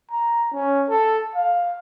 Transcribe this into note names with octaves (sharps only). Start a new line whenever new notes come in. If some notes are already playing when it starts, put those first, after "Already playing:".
A#5
C#4
A4
F5